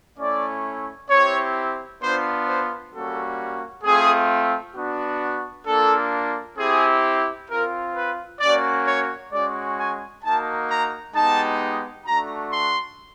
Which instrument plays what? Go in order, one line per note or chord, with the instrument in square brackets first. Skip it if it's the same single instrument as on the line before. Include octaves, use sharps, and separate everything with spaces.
[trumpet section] A3 C#4 E4 D5
C4 E4 G4 C#5
B3 D4 F4 C5
C5
G3 A#3 C#4 F#4 A4
A3 C4 F4 G#4
B3 D4 F#4
A#3 D4 F4 A4
C4 E4 G4 G#4
C4 F4 A#4
B4
A#3 C#4 F#4 D5
C#5
G#3 C#4 F#4 D5
G#5
A#3 D#4 F#4 A5
A#5
G#3 B3 D#4 G4 A5
A3 D4 F#4 A#5
C6